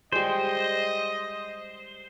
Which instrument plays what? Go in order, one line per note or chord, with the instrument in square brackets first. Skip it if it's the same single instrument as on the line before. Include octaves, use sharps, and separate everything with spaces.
[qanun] G3 G#3 [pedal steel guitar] C5 [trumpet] D#5